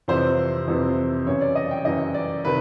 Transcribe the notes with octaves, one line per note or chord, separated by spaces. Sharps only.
F2 C3 E3 C5
F2 C3 E3
F#2 C#3 E3 C#5
D5
D#5
G5
F#2 C#3 E3 D#5
D5
C3 D#3 B4